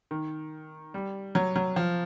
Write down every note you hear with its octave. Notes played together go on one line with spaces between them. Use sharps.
D#3
G3
F#3
F#3
F3